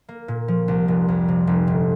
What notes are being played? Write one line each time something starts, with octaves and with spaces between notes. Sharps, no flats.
A#3
A#2
F3
C2
F1
F2
C3
F1
G1